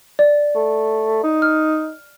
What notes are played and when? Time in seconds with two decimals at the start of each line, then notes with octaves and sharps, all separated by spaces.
0.19 D5
0.55 A3
1.23 D#4
1.42 F6